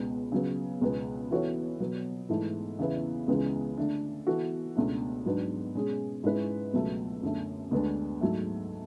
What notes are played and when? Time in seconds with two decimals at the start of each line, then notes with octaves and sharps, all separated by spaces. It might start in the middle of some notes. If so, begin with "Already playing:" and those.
Already playing: C#2 B2 G#3 B3
0.32 C#3 F#3 B3
0.81 C#2 B2 G#3 B3
1.31 E3 B3 F#4 A4 C#5
1.80 B2 F#3 B3
2.29 G#2 E3 A3 E4 A4
2.79 E2 C#3 E3 B3 E4
3.28 C#2 C#3 E3 G#3 B3
3.77 D3 A3 D4
4.27 E3 B3 F#4 A4
4.76 C#2 B2 A3 D4
5.26 G#2 F#3 B3 D4
5.74 B2 G#3 C#4 G#4
6.24 G#2 G#3 C#4 E4 B4
6.73 C#2 B2 F#3 A3
7.23 F#2 D3 A3
7.71 D2 D3 G#3 B3 D4
8.21 G#2 F#3 A3